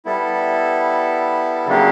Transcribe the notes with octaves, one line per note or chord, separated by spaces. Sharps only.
G3 B3 E4 A4
C#3 F#3 A#3 D4 G4